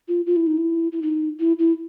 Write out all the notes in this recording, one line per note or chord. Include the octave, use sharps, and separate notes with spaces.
F4
F4
E4
D#4
E4
E4
D#4
E4
E4